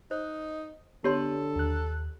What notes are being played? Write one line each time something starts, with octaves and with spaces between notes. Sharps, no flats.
D#4 C5
D3 B3 G4 A4 C#5 C6
D#2 F#6